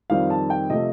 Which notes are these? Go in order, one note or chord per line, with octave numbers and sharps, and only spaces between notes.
F2 D#3 G3 C4 F5
A5
G5
C3 F3 A3 D#5